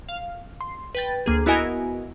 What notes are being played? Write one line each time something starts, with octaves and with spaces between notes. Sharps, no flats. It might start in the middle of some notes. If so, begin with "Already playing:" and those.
F5
C6
B4 G5 A6
D2 A#3 G#4
B3 E4 F#4 A#4 D#5 G#5